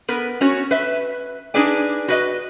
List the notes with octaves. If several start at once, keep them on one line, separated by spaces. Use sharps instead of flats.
B3 A#4 B4
C#4 F#4 C#5
B4 E5
D4 D#4 G#4 B4 D5 G#5
F#4 B4 D#5